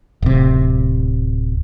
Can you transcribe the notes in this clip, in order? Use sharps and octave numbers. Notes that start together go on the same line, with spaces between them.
D1 C3